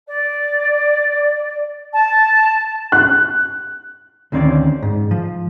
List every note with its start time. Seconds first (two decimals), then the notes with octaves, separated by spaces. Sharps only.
0.07 D5
1.92 A5
2.92 F#6
4.32 D2 D#3 C4 C#4 D5
4.82 G#2
5.11 F3